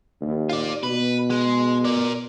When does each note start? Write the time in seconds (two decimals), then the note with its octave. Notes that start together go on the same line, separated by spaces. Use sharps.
0.21 D#2
0.50 F4 D5
0.84 B2 B4
1.30 G#3
1.85 A#4 D5